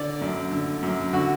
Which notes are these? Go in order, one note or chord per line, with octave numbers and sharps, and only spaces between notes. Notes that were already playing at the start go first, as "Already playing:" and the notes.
Already playing: D3 D5
F#2
D3
F#2
D3 F#4